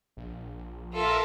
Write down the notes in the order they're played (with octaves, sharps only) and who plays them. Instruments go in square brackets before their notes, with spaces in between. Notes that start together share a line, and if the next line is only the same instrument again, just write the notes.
[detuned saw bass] A#1
[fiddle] F4 A4 [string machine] A#4 E5